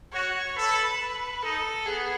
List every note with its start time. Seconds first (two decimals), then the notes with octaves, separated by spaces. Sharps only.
0.13 F#4 C#5
0.56 A4 B4
1.43 D#4 A4
1.86 B3 G#4